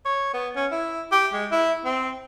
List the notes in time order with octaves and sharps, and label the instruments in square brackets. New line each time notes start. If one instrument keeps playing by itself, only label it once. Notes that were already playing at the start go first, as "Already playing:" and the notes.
[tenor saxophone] C#5
B3
C#4
E4
G4
G#3
E4
C4